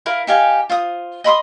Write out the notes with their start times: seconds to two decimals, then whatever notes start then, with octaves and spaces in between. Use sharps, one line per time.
0.06 E4 A#4 F5
0.27 D#4 G4 F5 G#5
0.69 F4 C5 D#6
1.24 D#5 B5 C6 D#6